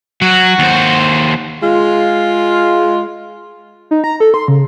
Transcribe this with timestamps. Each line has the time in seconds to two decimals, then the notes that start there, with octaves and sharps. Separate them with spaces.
0.22 F#3 F#4
0.59 D#2 C5
1.62 G#3 F4
3.91 D#4
4.04 A#5
4.20 A4
4.34 C6
4.48 C#3